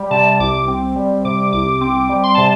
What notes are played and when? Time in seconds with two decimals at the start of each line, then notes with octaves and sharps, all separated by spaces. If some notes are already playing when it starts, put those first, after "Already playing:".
Already playing: G3
0.11 C3 A5
0.40 C2 D6
0.68 C4
0.96 G3
1.25 C3 D6
1.52 C2 D6
1.81 C4 D6
2.09 G3
2.23 C6
2.35 C3 A5